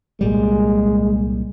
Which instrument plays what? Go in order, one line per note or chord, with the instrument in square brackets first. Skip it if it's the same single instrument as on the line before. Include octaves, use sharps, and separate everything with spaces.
[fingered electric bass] C2 A#2 G3 [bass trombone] G#3